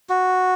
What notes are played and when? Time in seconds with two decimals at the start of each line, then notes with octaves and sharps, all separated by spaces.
0.09 F#4